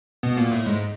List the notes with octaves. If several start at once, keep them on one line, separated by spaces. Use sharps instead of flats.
B2 B3
A#2 A#3
A2 A3
G#2 G#3